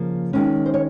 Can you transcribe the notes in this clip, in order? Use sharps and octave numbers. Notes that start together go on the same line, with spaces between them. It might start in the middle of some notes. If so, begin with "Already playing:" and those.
Already playing: C#3 F3 A#3
D#3 G#3 C#4
C5
C#5